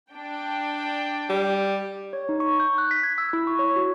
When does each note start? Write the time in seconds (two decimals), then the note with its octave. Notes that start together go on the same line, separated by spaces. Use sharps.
0.12 D4 G5
1.29 G3
2.13 C#5
2.29 D#4
2.40 C#6
2.60 G6
2.78 F#6
2.91 B6
3.03 G#6
3.18 E6
3.33 E4
3.47 C#6
3.59 C#5
3.76 F#4